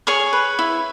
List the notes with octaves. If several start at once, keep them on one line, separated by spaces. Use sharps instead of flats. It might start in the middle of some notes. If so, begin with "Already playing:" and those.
G#4 C#5 C#6
B4
E4